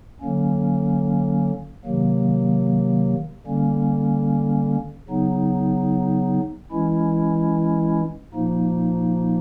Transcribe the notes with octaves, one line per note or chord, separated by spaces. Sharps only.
D3 F#3 A#3 C#4
C3 D#3 F#3 A#3
D3 G3 A#3 C#4
C#3 F#3 B3 D#4
E3 G#3 C#4 E4
A#2 F3 A#3 D#4